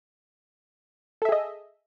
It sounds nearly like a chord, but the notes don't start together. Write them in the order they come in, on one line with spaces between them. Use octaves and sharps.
A4 E5 G#4 D#5